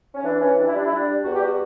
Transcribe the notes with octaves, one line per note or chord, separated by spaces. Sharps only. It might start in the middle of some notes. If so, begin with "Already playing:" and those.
C#4
E3 D4
E3 C#4
G3 D4
E4
G3 D4
E4
G3 D4
G3
E2 F#4
G4
G3 F#4